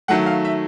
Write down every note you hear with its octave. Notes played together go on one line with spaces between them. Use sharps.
D#3 F#3 A3 F#5
F5
E5